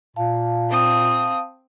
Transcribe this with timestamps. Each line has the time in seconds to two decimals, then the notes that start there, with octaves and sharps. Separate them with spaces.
0.16 A#2 F5 A5
0.70 C4 D#6